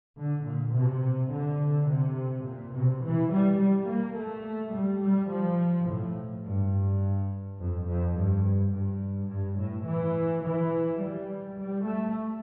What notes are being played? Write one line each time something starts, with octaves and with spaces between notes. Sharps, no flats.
D3
A#2
C3
D3
C3
A#2
C3
E3
G3
G3
A#3
A3
G3
G3
F3
A2
G2
F2
F2
G2
G2
G2
A2
E3
E3
G3
G3
A3